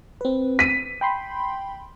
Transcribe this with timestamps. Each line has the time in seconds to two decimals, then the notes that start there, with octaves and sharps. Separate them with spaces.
0.21 C4 B4
0.59 B6 D#7
1.01 G5 B5 C6